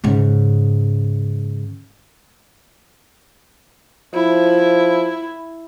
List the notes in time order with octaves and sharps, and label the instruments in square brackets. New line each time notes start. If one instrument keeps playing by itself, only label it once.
[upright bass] G#2 C#3
[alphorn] F3 [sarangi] E4